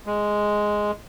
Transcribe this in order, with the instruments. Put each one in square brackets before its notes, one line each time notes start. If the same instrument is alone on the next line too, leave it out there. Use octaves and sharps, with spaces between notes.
[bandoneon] G#3